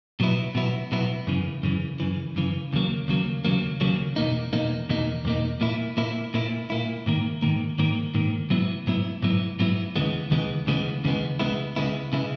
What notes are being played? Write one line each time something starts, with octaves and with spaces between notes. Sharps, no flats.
B2 F#3 B3 E4
B2 F#3 B3 E4
B2 F#3 B3 E4
F#2 C#3 E3
F#2 C#3 E3
F#2 C#3 E3
F#2 C#3 E3
D#2 C#3 F#3 A#3
D#2 C#3 F#3 A#3
D#2 C#3 F#3 A#3
D#2 C#3 F#3 A#3
E2 B2 A#3 D#4
E2 B2 A#3 D#4
E2 B2 A#3 D#4
E2 B2 A#3 D#4
A#2 A#3 E4
A#2 A#3 E4
A#2 A#3 E4
A#2 A#3 E4
G#2 D#3 A#3
G#2 D#3 A#3
G#2 D#3 A#3
G#2 D#3 A#3
G#2 F#3 B3 E4
G#2 F#3 B3 E4
G#2 F#3 B3 E4
G#2 F#3 B3 E4
D#2 C#3 E3 G#3 B3
D#2 C#3 E3 G#3 B3
D#2 C#3 E3 G#3 B3
D#2 C#3 E3 G#3 B3
C#2 C#3 G#3 B3 E4
C#2 C#3 G#3 B3 E4
C#3 G#3 B3 E4